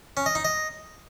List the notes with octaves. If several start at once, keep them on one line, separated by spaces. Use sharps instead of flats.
C#4
D#5
D#4
D#5